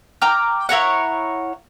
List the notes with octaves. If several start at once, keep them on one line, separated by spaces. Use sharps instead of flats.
G5 A#5 D6 F6
E4 A#4 C#5 F#5